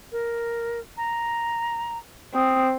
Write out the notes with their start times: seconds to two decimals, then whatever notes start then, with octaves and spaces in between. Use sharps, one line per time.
0.12 A#4
0.97 A#5
2.35 C4 D#6